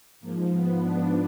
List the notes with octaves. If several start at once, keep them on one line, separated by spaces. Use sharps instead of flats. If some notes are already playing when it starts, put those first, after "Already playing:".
G#2 F3 A#3
B3
D4